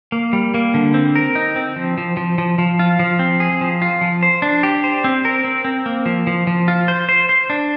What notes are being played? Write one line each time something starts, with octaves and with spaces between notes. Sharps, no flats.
A#3
G3
A#3
D3
C4
A#4
D#4
C4
F3
F3
F3
F3
F3
F4
F3
C4
G#4
F3
F4
F3
C5
D4
G4
C5
C4
A#4
C4
C4
A#3
F3
F3
F3
F4
C5
C5
C5
D4